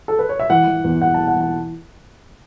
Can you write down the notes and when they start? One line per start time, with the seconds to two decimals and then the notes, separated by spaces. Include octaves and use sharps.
0.08 A4
0.19 B4
0.29 C#5
0.40 E5
0.50 E3 F#5
0.67 E3
0.84 E2
1.02 E2 F#5
1.14 A5
1.18 E3
1.28 F#5
1.36 E3 A5